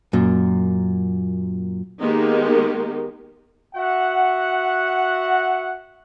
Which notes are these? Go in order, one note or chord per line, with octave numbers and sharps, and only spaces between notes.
F#2 A#2
D#3 G#3 A#3 B3 D#4 G4
F#4 E5 F#5